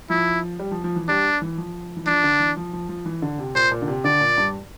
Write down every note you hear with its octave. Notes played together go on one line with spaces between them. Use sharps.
F3 E4
G3
F3
F3
E3
G3 D4
E3
F3
E3
F3 D4
D3
E3
F3
F3
F3
E3
D3
C3
A#2 C5
A#2
D3
C3
D3 D5
A#2
G2